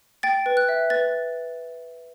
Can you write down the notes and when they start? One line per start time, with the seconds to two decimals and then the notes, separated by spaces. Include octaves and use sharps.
0.23 G5 A6
0.46 B4
0.57 F#6
0.69 E5
0.90 B4 A6